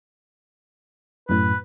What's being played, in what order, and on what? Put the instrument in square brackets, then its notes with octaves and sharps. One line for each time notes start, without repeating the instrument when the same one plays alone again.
[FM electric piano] F#2 A2 [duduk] B4